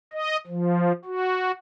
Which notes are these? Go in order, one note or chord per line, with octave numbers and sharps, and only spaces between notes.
D#5
F3
F#4